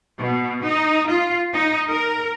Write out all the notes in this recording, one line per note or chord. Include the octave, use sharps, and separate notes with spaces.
B2
D#4
F4
D#4
A#4